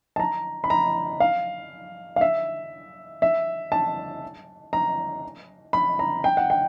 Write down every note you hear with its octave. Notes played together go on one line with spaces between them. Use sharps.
A5
A#5
B5
A#5
F5
F5
E5
E5
A5
A#5
B5
A#5
G5
F#5
G5